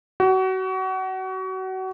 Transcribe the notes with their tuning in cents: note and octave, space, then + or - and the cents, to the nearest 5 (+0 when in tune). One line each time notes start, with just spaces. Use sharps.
F#4 +30